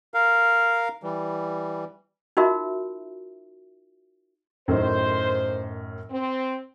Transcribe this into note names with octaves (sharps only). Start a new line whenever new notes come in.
A#4 F5
E3 G3
D#4 F4 F#4 A#4 E5
F#2 A2 D#3 C5
C4